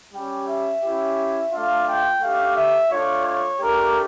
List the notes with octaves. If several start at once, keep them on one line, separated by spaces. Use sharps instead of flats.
G3 C#4 G4 G5
E5
C#4 E4 G4
A3 D4 F4 F5
G5
A3 D4 G4 F5
E5
A3 D4 F4 C#5
C#5
A3 D4 G4 A#4